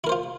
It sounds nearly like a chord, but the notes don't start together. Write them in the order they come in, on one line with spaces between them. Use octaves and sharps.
E4 A#4 C5 F4